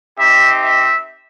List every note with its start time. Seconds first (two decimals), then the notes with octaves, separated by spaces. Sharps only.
0.18 C4 D#4 G4 E5
0.63 E5